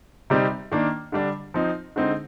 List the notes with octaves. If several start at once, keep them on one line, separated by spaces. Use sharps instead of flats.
C3 G3 C4 D#4
D#3 A#3 D4
D3 G3 D4
F3 C4 D#4
D3 G#3 C4 D#4